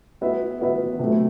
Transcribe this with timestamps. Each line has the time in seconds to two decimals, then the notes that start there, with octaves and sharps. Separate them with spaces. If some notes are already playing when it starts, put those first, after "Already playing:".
0.21 B3 F#4 B4 E5
0.61 B3 F#4 B4 E5
0.99 C3 F#3 A3